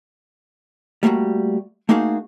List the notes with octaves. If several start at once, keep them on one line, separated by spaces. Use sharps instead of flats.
G3 A3 A#3 D#4 F#4
A3 A#3 D#4 F#4 G#4 F5